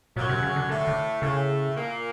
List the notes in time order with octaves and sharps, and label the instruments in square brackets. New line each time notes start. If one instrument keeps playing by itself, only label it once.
[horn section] F#2 F#3 [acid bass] A#2
[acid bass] C3
C#3
D3
[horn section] A2 A3 [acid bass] D3
[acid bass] D3
[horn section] A2 A3 [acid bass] C#3
[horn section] A#2 A#3